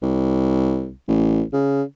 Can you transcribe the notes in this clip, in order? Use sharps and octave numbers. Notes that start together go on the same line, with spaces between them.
C2
A1
C#3